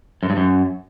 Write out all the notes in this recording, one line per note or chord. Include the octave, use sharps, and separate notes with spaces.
F#2
G2
F#2